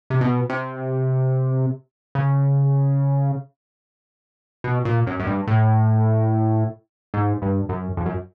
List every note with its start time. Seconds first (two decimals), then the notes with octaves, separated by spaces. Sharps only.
0.10 C3
0.21 B2
0.49 C3
2.15 C#3
4.64 B2
4.85 A#2
5.07 F#2
5.20 F#2
5.27 G2
5.47 A2
7.14 G#2
7.42 G2
7.69 F#2
7.97 F2
8.05 F#2